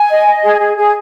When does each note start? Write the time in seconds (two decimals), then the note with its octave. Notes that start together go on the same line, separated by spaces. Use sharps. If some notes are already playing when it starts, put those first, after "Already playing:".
Already playing: G#5
0.09 D#5
0.26 D#5
0.42 G#4
0.60 G#4
0.76 G#4